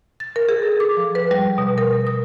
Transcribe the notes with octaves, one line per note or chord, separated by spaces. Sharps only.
A6
A#4
G#4
A4
D6
F3
B4
G3
B2
A#4
D#6